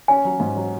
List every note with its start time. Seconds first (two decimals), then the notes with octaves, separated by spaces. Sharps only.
0.08 C#4 G#5
0.25 F#3
0.40 G#2
0.56 F#3